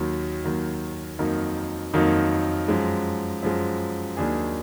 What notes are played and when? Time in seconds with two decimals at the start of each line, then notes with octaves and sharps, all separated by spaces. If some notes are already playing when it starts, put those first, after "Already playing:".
Already playing: D#2 D#3 F#3
0.44 D#2 D#3 F#3
1.19 F2 D#3 F#3 A#3 D#4
1.94 F2 D#3 F#3 A#3 D#4
2.68 F#2 F3 G#3
3.43 F#2 F3 G#3
4.17 D#2 D#3 F#3 D4 G#4